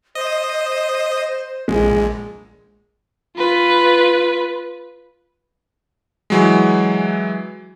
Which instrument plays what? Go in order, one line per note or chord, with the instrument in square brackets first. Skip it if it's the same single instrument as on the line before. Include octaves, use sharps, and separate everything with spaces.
[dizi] C5 [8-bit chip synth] D#5
[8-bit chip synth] A#1 [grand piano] G#3
[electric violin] F4 B4
[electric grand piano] E3 F#3 G#3